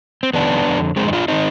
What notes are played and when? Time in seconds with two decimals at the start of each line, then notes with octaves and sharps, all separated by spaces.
0.23 C4
0.34 F2 C3 D#3 B3 D4
0.65 F2 D3
0.96 F2 D#3 G#3 C4
1.08 D#4
1.13 D4 F4
1.28 D#3 C4 D#4